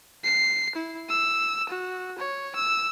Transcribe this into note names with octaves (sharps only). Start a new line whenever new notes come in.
C7
E4
E6
F#4
C#5
E6